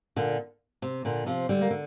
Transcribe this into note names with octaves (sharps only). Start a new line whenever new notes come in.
A#2 D3
C3
A#2 D3
C3 F3
D3 G3
A#3
D3